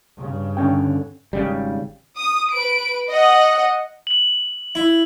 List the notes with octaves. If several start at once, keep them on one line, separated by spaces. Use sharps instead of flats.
G2 C#3
D3 C#4 G5
G#1 C#3 G3
D#6
B4 D7
D#5 F#5
F#7
E4